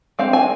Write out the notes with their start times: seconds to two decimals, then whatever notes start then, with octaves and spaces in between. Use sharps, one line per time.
0.19 G#3 C4 F5
0.33 G#5